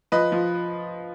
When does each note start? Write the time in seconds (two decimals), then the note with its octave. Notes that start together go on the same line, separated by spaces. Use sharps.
0.12 F3 B4 D#5
0.32 F3